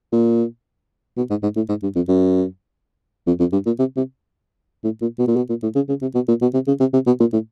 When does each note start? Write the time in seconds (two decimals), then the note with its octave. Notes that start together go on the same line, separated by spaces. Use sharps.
0.12 A#2
1.17 B2
1.30 G#2
1.42 G#2
1.56 A2
1.69 G#2
1.82 G2
1.95 F2
2.08 F#2
3.27 F2
3.40 F2
3.52 G2
3.66 A#2
3.79 C3
3.96 C3
4.84 A2
5.01 A#2
5.18 B2
5.27 A#2
5.36 B2
5.49 A#2
5.63 A2
5.75 C#3
5.88 C#3
6.01 C3
6.14 B2
6.28 A#2
6.41 B2
6.54 C3
6.67 C#3
6.80 C3
6.93 C3
7.06 B2
7.20 A#2
7.33 A2